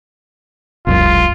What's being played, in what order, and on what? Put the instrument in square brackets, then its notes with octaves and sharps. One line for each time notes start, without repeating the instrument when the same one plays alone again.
[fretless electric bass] E1 C2 F#2 [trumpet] F4